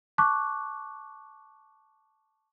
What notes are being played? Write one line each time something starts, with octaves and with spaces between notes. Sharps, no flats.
A5 C#6 D6 F#6